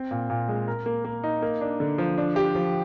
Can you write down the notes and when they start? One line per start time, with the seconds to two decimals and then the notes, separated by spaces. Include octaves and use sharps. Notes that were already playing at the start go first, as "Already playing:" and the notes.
Already playing: C4
0.11 A#2
0.29 A#2
0.49 G#3
0.68 A#4
0.86 A#3
1.05 A#3
1.24 D#4
1.42 A#3
1.61 D4
1.80 D3
1.98 F3
2.18 D4
2.36 G4
2.55 F3